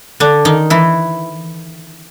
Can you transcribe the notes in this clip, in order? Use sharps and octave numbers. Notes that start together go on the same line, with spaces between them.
D3 D4
D#3 D#4
E3 E4